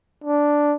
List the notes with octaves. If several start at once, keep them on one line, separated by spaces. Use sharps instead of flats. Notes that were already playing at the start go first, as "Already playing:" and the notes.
D4